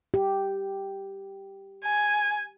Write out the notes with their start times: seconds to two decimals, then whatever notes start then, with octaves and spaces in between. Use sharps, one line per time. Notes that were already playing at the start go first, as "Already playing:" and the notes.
0.14 G4
1.85 G#5